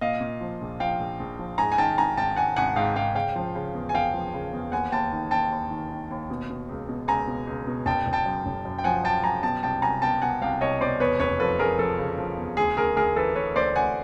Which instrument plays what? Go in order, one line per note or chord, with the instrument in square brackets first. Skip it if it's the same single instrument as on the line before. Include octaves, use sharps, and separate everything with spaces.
[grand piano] A#2 D#5 F5
A#2
F3
A#1
F3 F5 G5
A#1
A#1
F3
G#2 G#5 A#5
G#5
D#3 G5 A5
G#1 G#5 A#5
G#1 G5 A5
G#1 F#5 G#5
G#1 F#5 G#5
G#2 F5 G5
G#2 F5 G5
C#3 F5 G5
F3
C#3
E2
G#5
E2 F5 G5
F3
C#3
E2
D#2 F#5 G#5
D#2 G5 A5
D#3
D#2 G5 A5
D#2
D#3
D#3
D#2
B2
B2
C#2
B2
C#2 G#5 A#5
B2
C#2
B2
F#1 G5 A5
F#1
G5 A5
F#2
F#1
F#2
G5
F3 F#5 G#5
F#2 G5 A5
F#2 G#5 A#5
B2 G5 A5
C2 G5 A5
C2 G#5 A#5
B2 G5 A5
B2 F#5 G#5
C2 F5 G5
C2 C#5 D#5
B2 C5 D5
E2 B4 C#5
F1 B4 C#5
F3 A4 B4
F3 G#4 A#4
F3 A4
C#3
F3
E2
D2 G#4
D2 G#4 A#4
D2 G#4 A#4
E3 A4 B4
E3 B4 C#5
D2 C5 D5
D2 F#5 G#5